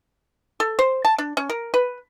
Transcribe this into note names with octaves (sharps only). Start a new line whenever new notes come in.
A4
C5
A5
D4
C#4
A#4
B4